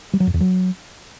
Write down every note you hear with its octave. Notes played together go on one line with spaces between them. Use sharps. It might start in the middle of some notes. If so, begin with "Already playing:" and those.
G3
F#3
F2
E2
F#3